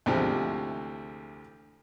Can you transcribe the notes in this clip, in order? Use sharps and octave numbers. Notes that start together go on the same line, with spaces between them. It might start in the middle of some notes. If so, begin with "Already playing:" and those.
D2 C3 E3 F3 G#3